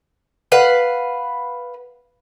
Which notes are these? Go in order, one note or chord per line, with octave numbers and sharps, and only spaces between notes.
B4 F5 F#5